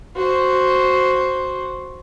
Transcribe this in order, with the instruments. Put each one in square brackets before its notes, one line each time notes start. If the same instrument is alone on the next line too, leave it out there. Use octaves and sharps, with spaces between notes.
[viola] F#4 C5